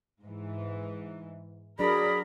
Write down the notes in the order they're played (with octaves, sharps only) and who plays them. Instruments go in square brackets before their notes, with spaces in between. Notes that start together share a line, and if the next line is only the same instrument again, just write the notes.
[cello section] G#2 E3
[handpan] F#3 D4 [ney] G#4 [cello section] A#4 [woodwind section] D5 B5